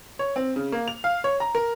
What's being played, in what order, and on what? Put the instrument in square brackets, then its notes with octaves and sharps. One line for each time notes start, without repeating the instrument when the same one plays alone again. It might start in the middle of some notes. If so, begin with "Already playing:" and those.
[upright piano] C#5
C4
C#3
A#3
F7
F5
C#5
A#5
A#4